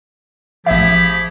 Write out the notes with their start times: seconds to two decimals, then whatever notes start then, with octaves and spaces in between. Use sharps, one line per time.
0.66 A1 F3 G4 G#4 E5 B5